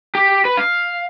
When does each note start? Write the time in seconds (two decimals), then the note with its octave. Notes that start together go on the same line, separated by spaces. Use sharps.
0.15 G4
0.45 B4
0.57 F5